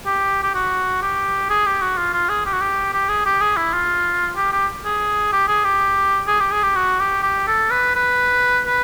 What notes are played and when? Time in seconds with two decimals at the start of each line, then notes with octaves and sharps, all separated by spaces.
0.06 G4
0.43 G4
0.54 F#4
1.02 G4
1.50 G#4
1.66 G4
1.81 F#4
1.98 F4
2.13 F4
2.29 G#4
2.46 G4
2.53 F#4
2.61 G4
2.93 G4
3.09 G#4
3.26 G4
3.40 G#4
3.56 E4
3.73 F4
4.36 G4
4.52 G4
4.85 G#4
5.32 G4
5.48 G#4
5.64 G4
6.27 G#4
6.40 G4
6.51 G#4
6.63 G4
6.76 F#4
7.00 G4
7.23 G4
7.47 A4
7.71 B4
7.95 B4
8.66 B4